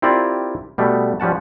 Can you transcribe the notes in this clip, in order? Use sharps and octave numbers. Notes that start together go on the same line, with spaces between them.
C4 E4 F4 G4 A#4 D5
B2 G3 A3 B3
F3 G3 C#4 F#5 A5